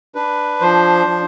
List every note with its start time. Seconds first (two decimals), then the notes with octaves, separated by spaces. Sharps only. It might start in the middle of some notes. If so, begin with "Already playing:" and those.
0.15 D4 B4
0.61 F3 C5
1.07 F3